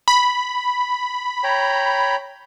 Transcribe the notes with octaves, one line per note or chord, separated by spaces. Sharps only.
B5
C#5 G5 A#5